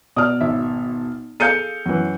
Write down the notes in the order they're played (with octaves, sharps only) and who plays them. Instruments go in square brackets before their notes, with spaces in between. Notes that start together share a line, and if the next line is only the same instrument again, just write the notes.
[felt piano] B2 F6 [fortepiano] D5 D#6
[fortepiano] G#1 E5
[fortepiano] G#4 A4 F5 [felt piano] G6 C#7 D#7
[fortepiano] F#2 E3